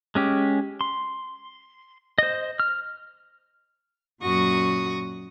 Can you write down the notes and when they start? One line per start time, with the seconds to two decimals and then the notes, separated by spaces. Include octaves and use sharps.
0.15 G#3 C#4 G4
0.81 C6
2.18 C5 D#5
2.60 F6
4.22 F#2 A#2 F#4 C#6 D#6 A#6